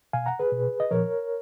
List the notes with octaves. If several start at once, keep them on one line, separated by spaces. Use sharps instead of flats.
B2 F5 G#5
F#5 A#5
G#4 B4
B2
D#5
A#2 F3 A#4 C#5